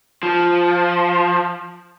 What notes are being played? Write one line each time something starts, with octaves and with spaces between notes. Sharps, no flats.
F3